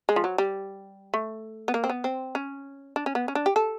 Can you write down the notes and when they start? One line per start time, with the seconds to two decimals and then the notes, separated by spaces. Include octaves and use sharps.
0.09 G#3
0.16 F3
0.24 F#3
0.38 G3
1.14 A3
1.68 B3
1.74 A#3
1.84 C4
1.89 B3
2.04 C4
2.35 C#4
2.96 D4
3.06 C#4
3.15 B3
3.28 C#4
3.35 D4
3.46 G4
3.56 A4